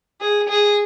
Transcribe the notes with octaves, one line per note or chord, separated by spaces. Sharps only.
G#4
G#4